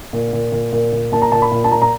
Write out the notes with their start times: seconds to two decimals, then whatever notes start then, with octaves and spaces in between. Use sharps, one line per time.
0.13 A#2
0.33 A#2
0.52 A#2
0.73 A#2
0.93 A#2
1.12 A#2 A5
1.22 A#5
1.32 A#2 A5
1.42 B5
1.52 A#2
1.64 A5
1.72 A#2 A#5
1.82 A#5